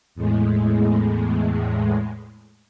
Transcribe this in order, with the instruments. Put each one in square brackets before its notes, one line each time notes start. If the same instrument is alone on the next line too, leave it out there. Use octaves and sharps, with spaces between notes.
[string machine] E2 A2 G#3